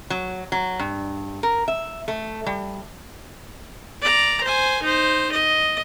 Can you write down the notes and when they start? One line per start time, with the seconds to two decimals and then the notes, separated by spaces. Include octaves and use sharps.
0.10 F#3
0.52 F#3
0.79 G2
1.43 A#4
1.68 E5
2.08 A3
2.46 G3
4.02 D5 A#5
4.44 C5 G#5
4.83 D#4 C5
5.32 D#5